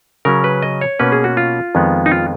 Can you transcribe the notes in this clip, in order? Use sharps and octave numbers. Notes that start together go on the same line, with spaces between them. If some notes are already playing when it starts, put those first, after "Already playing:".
C#3 F#3 C#4 A#4
B4
D#5
C#5
B2 A#3 C#4 B4
G#4
F#4
F4
F2 D#3 G#3 B3
D#4
F4